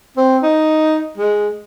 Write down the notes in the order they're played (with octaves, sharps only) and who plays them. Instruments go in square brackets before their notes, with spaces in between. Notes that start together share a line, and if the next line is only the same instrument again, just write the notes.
[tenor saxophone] C4
D#4
G#3